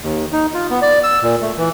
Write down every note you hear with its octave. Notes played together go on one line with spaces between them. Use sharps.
D#2
D#4
F4
B3
D5
E6
A#2
A3
E3